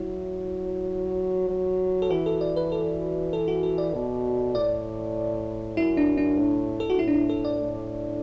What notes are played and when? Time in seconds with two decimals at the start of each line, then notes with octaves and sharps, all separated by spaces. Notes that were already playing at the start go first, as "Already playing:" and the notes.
Already playing: F#3 E4
1.50 F#3
2.02 A4
2.10 E3 F#4
2.26 A4
2.41 D5
2.56 B4
2.72 A4
3.33 A4
3.48 F#4
3.63 A4
3.78 D5
3.94 B2
4.55 A2 D5
5.77 F#2 E4
5.97 D4
6.18 D4
6.38 A2
6.80 A4
6.90 F#4
6.98 A2 E4
7.08 D4
7.14 E4
7.29 A4
7.45 D5
7.60 A2